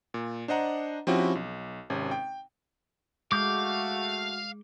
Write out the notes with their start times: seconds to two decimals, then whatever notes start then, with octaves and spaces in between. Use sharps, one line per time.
0.14 A#2
0.48 D4 C5 D#5 F#5 A#5
1.07 F3 C4 C#4 E4 F#4 G4
1.35 B1
1.90 G#1 C3 C#4
2.11 G5
3.32 G#3 A3 F#4 F5 D6 G6